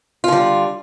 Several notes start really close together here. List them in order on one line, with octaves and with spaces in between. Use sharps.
F4 D3 G3